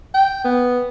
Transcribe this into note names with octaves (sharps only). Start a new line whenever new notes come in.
G5
B3